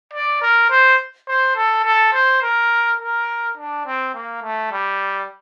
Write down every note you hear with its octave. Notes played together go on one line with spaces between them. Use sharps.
D5
A#4
C5
C5
A4
A4
C5
A#4
A#4
D4
C4
A#3
A3
G3